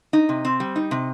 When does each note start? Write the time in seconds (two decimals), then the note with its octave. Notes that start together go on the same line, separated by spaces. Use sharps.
0.13 D#4
0.29 C3
0.45 C4
0.60 G3
0.76 D#4
0.91 C3